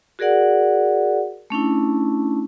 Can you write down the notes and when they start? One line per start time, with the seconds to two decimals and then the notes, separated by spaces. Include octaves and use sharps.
0.19 F#4 G#4 A#4 D5 F#5
1.50 A3 C#4 D4 E4